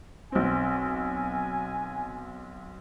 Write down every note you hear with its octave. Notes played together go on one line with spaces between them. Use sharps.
B1 C4 G#5